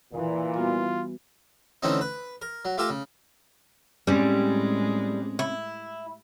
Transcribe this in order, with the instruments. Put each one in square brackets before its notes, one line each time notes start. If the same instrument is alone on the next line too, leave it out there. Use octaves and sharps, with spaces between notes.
[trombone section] A#2 [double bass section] E3
[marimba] G3 B3 F#4 [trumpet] F4
[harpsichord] D3 E3 A3 C4 C#4 D#4
B4
A#4
F#3
A3 F4 G4 A4 A#4
C#3
[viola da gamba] A2 G#3 [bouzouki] G3 [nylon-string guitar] C4 C#4
[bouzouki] E4